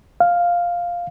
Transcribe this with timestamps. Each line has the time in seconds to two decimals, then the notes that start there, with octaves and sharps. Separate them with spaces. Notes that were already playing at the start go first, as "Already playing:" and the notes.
0.20 F5